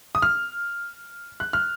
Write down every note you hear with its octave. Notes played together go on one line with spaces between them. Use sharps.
D#6
F6
F#6
F6